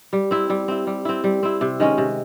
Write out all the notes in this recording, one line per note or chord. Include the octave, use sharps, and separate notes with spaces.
G3
C4 E4
G3
C4 E4
G3
C4 E4
G3
C4 E4
C3
D#3 G#3 C#4
C3